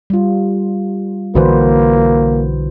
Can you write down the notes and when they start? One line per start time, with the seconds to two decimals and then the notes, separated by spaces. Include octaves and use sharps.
0.10 G3 F4
1.35 B1 D3 E3 A#3 F#4 B4 C5